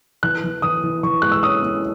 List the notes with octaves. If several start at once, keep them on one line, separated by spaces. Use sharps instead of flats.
E3 F#6
E3
E3 D#6
E3
E3 C#6
G#3 F#6
E6
C#4 D#6
C#4